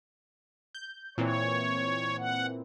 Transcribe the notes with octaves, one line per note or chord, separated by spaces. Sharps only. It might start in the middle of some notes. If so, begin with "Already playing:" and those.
G6
A#2 E3 C4 C#5
F#5